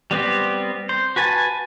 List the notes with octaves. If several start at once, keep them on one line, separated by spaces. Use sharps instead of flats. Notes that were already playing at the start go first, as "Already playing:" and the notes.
G3 B3 C4 G4
C5
F#4 B4 G#5 A5